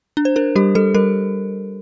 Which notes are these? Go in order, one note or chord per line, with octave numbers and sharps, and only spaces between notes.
D4
C5
D4 A#4
G3 G4
G3 A4
G3 A#4